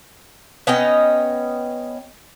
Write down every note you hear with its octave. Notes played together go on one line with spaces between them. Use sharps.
B3 C#4 D#5 G5